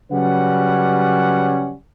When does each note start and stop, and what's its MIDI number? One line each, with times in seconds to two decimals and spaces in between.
0.11 1.73 49
0.11 1.73 54
0.11 1.73 55
0.11 1.73 61
0.11 1.73 71
0.11 1.73 78